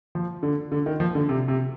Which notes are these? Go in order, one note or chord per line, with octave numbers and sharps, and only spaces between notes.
F3
D3
D3
D#3
F3
D3
C3
C3